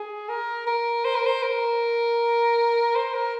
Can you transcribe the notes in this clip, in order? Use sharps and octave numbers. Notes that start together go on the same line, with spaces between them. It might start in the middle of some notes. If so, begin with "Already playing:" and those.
Already playing: G#4
A#4
A#4
C5
A#4
C5
A#4
C5
A#4